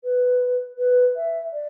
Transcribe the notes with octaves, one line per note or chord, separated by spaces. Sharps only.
B4
B4
E5
D5